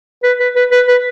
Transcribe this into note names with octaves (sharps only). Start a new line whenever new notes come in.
B4
B4
B4
B4
B4